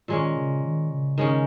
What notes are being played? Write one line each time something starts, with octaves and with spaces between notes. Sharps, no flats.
A#2 D#3 G#3 C#4
C#3
D#3
C#3
D#3 G#3 C#4